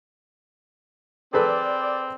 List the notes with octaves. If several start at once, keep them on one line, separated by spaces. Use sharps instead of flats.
C4 G#4 A4 B4 D5